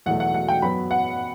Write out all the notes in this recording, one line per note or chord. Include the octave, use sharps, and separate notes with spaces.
E2 B2 F#3 A3 F#5
F#5
F#5
G5
F#2 F#3 B3 B5
F#5